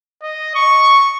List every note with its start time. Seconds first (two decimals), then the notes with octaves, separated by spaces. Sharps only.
0.23 D#5
0.55 C#6